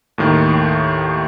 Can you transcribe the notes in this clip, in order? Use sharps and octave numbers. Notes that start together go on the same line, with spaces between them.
D#2 A2 D#3